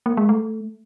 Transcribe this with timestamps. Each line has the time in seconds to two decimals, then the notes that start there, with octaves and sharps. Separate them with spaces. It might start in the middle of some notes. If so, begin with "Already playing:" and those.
0.06 A#3
0.17 G#3
0.29 A3